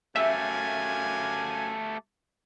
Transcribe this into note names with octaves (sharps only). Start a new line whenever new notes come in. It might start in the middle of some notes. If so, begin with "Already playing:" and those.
F#2 A3 G4 E5 F5 G#5